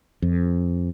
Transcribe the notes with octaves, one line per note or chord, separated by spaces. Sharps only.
F2